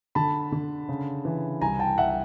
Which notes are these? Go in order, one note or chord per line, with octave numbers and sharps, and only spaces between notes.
D3 A5 B5
D3
C#3
E3
C2 G#5 A#5
G5 A5
C2 E5 F#5